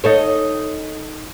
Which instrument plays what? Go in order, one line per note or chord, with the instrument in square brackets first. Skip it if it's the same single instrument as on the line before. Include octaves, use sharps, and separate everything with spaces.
[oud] D#4 A4 C#5